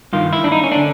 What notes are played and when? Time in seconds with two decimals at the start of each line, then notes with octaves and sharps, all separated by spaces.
0.13 G2 D#3 F4
0.33 E4
0.44 D4
0.52 D#4
0.64 C#4
0.72 D3 D4